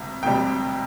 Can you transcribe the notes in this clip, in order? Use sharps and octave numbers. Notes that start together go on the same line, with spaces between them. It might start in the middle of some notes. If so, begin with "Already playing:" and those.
Already playing: E1 D2 C3
E1 D2 C3 G3 G5